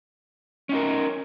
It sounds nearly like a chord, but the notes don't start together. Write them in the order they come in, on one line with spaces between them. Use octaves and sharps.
C#4 D#4 A#4